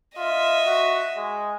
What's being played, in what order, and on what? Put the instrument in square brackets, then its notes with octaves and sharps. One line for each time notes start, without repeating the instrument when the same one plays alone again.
[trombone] F4 [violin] D#5 E5
[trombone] F#4
G#3